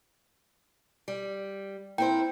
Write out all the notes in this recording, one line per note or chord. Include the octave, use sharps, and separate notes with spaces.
G3
A#3 C4 E4 C5 G5